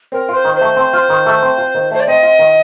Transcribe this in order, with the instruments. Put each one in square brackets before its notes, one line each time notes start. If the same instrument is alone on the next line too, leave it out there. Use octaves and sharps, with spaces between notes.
[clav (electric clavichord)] C4 [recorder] A#4
[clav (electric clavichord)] F4 [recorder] C5
[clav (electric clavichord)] D#3
[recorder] C5
[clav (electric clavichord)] A3
C4
F4
D#3
A3
C4
F4
D#3
[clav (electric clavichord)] A3 [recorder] C5
[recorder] D5
[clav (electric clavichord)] C4 [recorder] D#5
[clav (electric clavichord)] F4
D#3